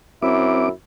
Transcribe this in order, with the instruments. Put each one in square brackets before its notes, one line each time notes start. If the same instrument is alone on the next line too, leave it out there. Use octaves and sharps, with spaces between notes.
[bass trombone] F#2 [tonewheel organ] C4 D6 [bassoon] E4